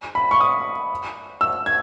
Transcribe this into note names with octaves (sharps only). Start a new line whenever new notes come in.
B5
C#6
D#6
E6
G#6